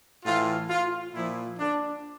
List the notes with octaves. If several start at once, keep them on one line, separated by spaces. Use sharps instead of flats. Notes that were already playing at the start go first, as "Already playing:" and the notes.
A2 E3 F4
F4
A#2 F3 E4
D4